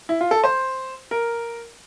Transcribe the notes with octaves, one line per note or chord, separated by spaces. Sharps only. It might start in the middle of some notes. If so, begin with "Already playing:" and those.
E4
F4
A4
C5
A#4